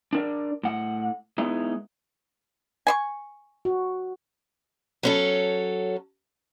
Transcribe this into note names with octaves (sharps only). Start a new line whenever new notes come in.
D4 A#4 D5
A2 F#5
G#3 B3 D#4 E4
G#5 C6 C#6
F#4
F#3 C#4 A4